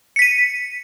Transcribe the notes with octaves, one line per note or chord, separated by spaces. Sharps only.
B6 C#7 D#7